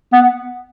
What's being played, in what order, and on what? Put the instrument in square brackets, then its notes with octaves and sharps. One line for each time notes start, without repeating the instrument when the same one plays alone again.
[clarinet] B3